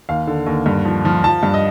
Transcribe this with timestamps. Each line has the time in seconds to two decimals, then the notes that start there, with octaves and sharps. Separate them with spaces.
0.09 D#2 F5
0.27 D3
0.46 D#2
0.66 G2
0.85 F3
1.05 F3
1.24 F3 A5
1.43 G2
1.54 D#5